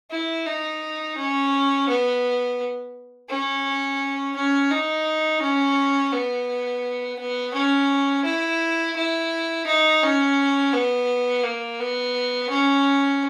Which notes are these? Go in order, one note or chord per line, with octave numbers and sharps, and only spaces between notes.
E4
D#4
C#4
B3
C#4
C#4
D#4
C#4
B3
B3
C#4
E4
E4
D#4
C#4
B3
A#3
B3
C#4